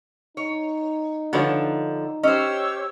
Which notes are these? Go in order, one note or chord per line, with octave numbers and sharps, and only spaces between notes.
D#4 C#5
D3 F3 F#4 B4 C#5
C#4 G4 C5 C#5 D#5 E6